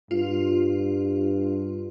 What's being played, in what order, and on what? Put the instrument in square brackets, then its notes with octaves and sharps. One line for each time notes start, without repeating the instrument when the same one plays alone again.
[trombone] G2 [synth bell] F4